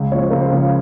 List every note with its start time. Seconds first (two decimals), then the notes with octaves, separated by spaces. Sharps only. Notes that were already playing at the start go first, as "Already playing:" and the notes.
Already playing: C#2
0.12 C#3 F3 C#5
0.22 C5
0.30 C#2 A#4
0.40 C5
0.52 C#3 F3